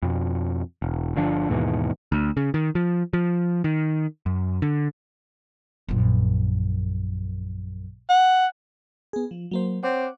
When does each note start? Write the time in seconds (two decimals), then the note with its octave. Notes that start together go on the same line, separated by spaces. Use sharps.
0.02 F2 B2
0.82 E1
1.16 G1 D3 F3 D4
1.49 D#2 G#2 B2 E3
2.12 D2
2.37 C#3
2.54 D#3
2.75 F3
3.13 F3
3.64 D#3
4.26 F#2
4.62 D3
5.88 A#1 F#2
8.09 F#5
9.13 B3 G#4
9.31 F3
9.51 F#3 A#3 C5
9.83 C4 C#5 F#5 D6